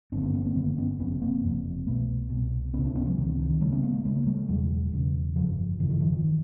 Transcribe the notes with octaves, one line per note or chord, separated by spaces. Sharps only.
G1 F#2 D3 C4 D4
B3 C#4
B3 C#4
A#3 C4
G1 F#2 D3 A3 B3
B3 C#4
F#1 F2 C3 B3 C#4
A#3 C4
F#1 F2 C3
C2 B2 A3 B3
C2 B2
C#2 C3 B3 C#4
C4 D4
B3 C#4
F3 G3
C#2 C3 D#3
D3
D#3
D#3
D2 C#3 G3 A3
B3 C#4
A3 B3
G#3 A#3
D2 C#3 G#3 A#3
G3 A3
E1 E2 C#3 F#3 G#3
E1 E2 C#3
G1 F2 C#3 F3 G3
G1 F2 C#3 E3
D#3 F3
D#3 F3
D#3